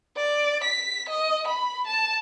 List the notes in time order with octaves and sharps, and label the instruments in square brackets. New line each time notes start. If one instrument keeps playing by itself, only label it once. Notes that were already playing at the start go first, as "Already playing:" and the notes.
[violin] D5
B6
D#5
B5
A5